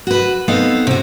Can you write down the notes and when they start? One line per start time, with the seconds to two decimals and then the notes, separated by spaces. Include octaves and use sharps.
0.07 F#4 B4
0.48 B3 C4 D#4 A4 F5
0.87 C3 F#4